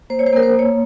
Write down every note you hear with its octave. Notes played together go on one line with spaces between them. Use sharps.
A#3 C5
C#5
C5
A#3 A#4
C5
A#3
C#5